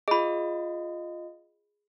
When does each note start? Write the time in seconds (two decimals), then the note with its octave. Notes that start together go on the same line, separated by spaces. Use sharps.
0.08 F4 G#4 D#5 B5